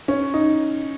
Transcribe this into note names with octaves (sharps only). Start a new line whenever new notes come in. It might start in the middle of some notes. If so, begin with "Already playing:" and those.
C#4
D#4